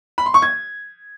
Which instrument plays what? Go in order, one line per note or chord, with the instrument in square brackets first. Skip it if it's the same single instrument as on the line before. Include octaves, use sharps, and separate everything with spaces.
[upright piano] B5
C6
C#6
G#6